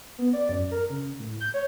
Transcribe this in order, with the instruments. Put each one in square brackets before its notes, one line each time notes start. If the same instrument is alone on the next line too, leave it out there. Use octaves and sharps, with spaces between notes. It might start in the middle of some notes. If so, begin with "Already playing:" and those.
[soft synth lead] B3
D5
F#2
A#4
C#3
A2
G6
C#5